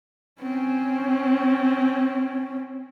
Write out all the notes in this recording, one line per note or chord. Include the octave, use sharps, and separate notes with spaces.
C4 C#4